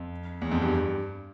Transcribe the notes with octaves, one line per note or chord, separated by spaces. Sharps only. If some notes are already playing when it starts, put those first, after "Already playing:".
Already playing: F2
E2
F2
G2